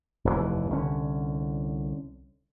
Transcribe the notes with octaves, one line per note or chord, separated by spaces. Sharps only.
F1 D#2 A2 E3
C2 D3 C#4